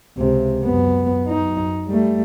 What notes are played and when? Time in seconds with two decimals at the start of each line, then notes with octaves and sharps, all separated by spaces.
0.17 C#2 C3
0.65 F#2 B3
1.28 F#2 D#4
1.88 G3 A3